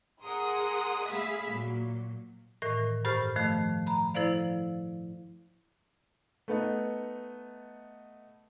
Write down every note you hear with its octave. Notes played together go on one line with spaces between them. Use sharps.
G#4 A#4 F#5 C6 D#6
A3 G#4 E5 F5 B5 B6
A#2 F#3
A2 D#3 E3 A#4
G2 G4 A4 C5 C#6 F6
D#3 F3 A3
A#5 B5
F3 E4 A4 C5 D5 F5
A3 B3 D#4